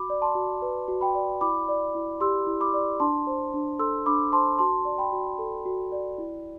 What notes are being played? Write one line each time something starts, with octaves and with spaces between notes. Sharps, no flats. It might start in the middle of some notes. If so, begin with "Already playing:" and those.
Already playing: F#4 B5 D6
D5
A5 C6
F#4
B4
F#4
G5 B5
D5
E4 B5 D6
D5
E4
G4 C6 E6
E4
B5 D6
D5
D4 A5 C6
C5
D4
A4 C6 E6
D4 B5 D6
C5 A5 C6
F#4 A5 C6
D5
G5 B5
F#4
A4
F#4
D5
E4